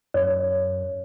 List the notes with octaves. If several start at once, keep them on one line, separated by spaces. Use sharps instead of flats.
F#2 C#5